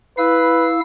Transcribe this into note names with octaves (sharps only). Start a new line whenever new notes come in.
E4 B4 F5 E6